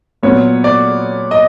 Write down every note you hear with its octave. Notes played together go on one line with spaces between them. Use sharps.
A#2 F#3 B3 C#5
D5
D#5